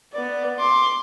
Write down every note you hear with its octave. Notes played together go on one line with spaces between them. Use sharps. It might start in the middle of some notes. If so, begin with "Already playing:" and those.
B3 D5
C6 D6